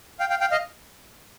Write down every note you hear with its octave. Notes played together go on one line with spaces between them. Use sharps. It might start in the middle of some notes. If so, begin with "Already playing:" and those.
F5 G5
F5 G5
F5 G5
D#5 F5